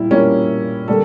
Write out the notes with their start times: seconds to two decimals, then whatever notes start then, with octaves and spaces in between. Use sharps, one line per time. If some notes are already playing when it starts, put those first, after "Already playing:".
Already playing: A#2 G3 E4
0.11 A#2 G3 A#3 C#4
0.88 D3 G3 A#3 A4